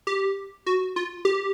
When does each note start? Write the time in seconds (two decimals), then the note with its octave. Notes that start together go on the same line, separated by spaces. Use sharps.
0.07 G4
0.66 F#4
0.96 F4
1.25 G4